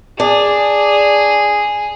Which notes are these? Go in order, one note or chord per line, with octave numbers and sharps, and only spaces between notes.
D4 G#4